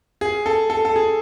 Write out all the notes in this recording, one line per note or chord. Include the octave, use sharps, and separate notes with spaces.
G#4
A4
A4
A4
G#4